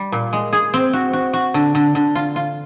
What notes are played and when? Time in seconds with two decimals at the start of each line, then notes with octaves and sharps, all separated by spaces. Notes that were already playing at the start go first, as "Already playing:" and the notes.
Already playing: G3
0.12 A#2
0.33 G#3
0.53 G#4
0.74 C4
0.93 F#4
1.13 F#4
1.33 F#4
1.54 D3
1.75 D3
1.95 D3
2.15 F4
2.36 F4